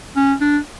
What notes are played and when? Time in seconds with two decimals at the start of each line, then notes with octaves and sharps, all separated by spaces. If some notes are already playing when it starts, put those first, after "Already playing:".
0.17 C#4
0.41 D4